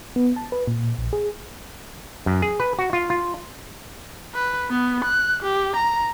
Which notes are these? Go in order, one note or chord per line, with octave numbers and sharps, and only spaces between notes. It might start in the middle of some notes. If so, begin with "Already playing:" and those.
B3
A5
B4
A#2
A#1
G#4
F#2
G#4
B4
F#4
F4
F4
B4
B3
F#6
G4
A#5